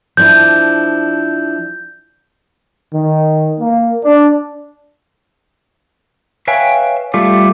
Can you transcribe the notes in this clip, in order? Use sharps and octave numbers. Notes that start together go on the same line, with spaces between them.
F3 D4 E4 G6
D#3
A#3
D4
B4 C#5 E5 F5 G5 G#5
G3 A3 F4 G4 A4 D5